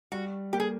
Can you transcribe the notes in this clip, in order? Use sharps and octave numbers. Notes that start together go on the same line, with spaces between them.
G3 F#4
A#3 G4
G#4